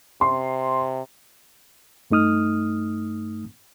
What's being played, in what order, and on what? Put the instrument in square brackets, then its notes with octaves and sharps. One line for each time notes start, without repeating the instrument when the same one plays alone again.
[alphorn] C3 [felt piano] C6
[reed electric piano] G2 A3 D#4 D#6 F6